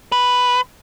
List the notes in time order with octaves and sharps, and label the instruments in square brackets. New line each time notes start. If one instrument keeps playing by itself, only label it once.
[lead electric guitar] B4